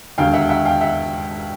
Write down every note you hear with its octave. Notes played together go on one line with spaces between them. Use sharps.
E1 D#2 D3 F5 G5
E5 F#5
E5 F#5
F5 G5
E5 F#5